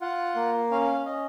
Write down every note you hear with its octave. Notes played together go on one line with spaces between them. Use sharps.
F4 F#5
A#3
C#4 F5
C#4 D#5